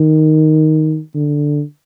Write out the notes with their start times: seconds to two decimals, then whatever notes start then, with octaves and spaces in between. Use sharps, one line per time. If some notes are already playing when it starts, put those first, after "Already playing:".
Already playing: D#3
1.14 D3